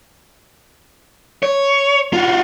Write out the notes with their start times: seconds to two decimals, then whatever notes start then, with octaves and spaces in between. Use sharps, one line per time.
1.43 C#5
2.13 F4 F#4